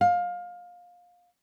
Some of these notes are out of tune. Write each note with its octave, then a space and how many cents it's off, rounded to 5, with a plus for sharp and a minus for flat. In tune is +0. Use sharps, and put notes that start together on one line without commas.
F5 +20